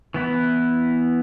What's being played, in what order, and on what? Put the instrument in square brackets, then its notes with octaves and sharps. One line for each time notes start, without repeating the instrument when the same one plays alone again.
[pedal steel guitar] E3 B3 E4